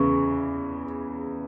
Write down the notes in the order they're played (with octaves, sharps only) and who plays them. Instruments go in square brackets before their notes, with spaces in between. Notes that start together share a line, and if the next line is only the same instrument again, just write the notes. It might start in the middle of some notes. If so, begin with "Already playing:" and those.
Already playing: [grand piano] E2 C#3 E3 [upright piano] C#6